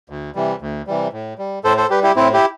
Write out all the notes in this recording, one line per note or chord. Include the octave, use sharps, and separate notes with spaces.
D2
C3 E3 G3
D2
C3 E3 G3
A2
G3
A2 A4 C5
A4 C5
G3 G4 B4
E4 G4
A2 C4 E4
E4 G4